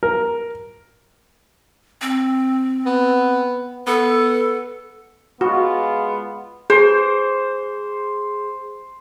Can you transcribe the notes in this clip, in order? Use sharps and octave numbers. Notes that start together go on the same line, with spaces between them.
A#4
C4
B3
B3 A4
G#3 B3 F4 F#4
G#4 C5